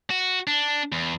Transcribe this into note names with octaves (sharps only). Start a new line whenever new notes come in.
F#4
D4
E2